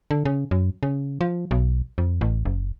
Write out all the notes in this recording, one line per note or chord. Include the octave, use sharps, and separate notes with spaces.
D3
C#3
F#2
C#3
F3
B1
F2
A1
F#1